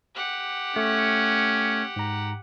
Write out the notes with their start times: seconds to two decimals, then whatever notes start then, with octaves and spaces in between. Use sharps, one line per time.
0.15 G4 F#5
0.76 A3 C#4
1.96 G#2 A#5